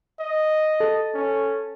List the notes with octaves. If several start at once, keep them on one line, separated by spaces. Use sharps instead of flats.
D#5
A4
C#4